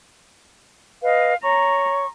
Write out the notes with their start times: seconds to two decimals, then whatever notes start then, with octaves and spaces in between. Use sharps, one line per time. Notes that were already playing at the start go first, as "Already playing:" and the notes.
1.02 B4 D#5 F5
1.43 C#5 A#5 C#6